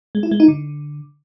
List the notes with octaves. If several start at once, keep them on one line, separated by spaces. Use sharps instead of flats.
G#3
E4
G#3
D#4
D3